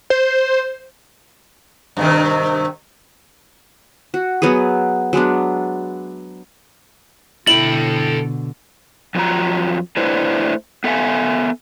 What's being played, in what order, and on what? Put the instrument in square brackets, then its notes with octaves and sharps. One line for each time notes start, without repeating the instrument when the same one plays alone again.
[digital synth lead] C5
[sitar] G2 C3 D#3
[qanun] F#4
F#3 B3 F#4 G#4
F#3 G#3 B3 D4
[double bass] B2 D3 [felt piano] E4 [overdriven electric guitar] A4 G5 [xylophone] F#7
[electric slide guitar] F2 F3 F#3 F4 A#5
A3 D4 E4 B4 C5
B3 A4 E5 F5 G#5